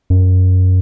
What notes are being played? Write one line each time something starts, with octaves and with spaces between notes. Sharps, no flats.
F#2